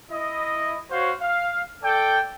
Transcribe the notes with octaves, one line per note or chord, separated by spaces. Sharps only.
E4 D#5
F#4 C5 C#5 F5
F5
A4 D5 G5